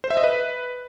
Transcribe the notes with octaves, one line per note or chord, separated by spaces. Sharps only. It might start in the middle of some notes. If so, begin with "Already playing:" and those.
C5
E5
D#5
B4